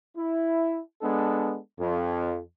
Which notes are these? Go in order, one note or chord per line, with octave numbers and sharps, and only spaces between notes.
E4
G#3 B3 D4 A4
F2